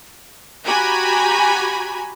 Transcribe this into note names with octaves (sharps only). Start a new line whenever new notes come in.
F#4 G4 G#5 A#5 B5